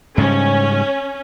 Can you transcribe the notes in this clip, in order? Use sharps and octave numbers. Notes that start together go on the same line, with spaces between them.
G#2 C#3 G3 C#4